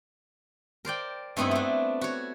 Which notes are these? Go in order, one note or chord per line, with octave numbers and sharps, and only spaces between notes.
A#4 C5 D5 G5
G2 A3 B3 C4 D#4 E4
A3 D4
F#4 C#5